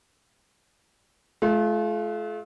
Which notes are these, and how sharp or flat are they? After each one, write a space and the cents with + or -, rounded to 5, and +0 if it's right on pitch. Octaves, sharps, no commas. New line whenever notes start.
A3 -45 F4 -15